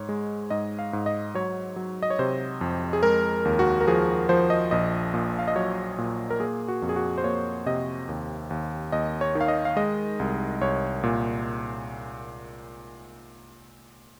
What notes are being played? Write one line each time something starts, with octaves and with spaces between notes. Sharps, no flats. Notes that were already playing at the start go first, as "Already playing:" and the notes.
Already playing: G#2 C#5
G#3
G#2 D#5
F5
G#2
D#5
F#3 C#5
F#3
D#5
C#5
C3 C5
F2
G#4
G#3 A#4
D#2
F#4
A#4
F3 G#4
F3 C5
D#5
A#1 D#5
A#2
F5
D#5
F#3 C#5
A#2
A#4
A#3 G#4
F#4
F2
G#4
F#4
C5
A#3 C#5
C3 D#5
D#2
D#2
D#2 D#5
C#5
D#3
F5
D#5
F5
G#3 D#5
C2
C2 C#5
A#2